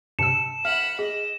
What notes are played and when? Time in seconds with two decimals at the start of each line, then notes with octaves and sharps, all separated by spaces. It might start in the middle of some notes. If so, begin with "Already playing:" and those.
0.19 G2 C3 A5 E6 C#7 E7
0.65 E5 F#5 B5 F6
0.99 G#4 D#5